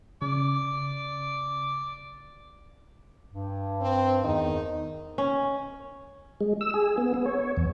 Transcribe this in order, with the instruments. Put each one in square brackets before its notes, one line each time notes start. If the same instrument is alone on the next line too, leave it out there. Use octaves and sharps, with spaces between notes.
[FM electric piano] C#3 [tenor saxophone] D5
[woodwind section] G2
[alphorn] C4
[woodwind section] E2 D#3 [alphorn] D#4
[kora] C#4
[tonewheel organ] G#3
E6
G#4
B3
B3
C#5
E2